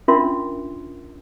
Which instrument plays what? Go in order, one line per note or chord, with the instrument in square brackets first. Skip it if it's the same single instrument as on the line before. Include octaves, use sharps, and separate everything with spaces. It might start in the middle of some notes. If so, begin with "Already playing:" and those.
[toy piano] C#4 D4 F4 A#4 E5 C6